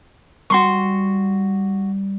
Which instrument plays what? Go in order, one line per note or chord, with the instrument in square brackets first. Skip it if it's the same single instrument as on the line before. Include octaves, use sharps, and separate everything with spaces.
[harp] G3 [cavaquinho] F#4 C6 C#6